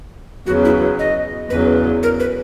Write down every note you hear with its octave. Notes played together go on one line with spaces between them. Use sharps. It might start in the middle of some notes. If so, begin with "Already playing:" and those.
E2 C#3 F#3 B3 F#4
E4
D#5
E2 C#3 F#3 B4
A#4
B4